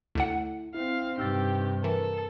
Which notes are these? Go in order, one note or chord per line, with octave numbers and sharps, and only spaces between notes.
D2 D3 E4 F#5
C4 E4 F5
G2 C3 D#4 G4 E6 A6
E3 A4 A#4